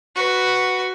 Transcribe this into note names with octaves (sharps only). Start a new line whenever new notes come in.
F#4 B4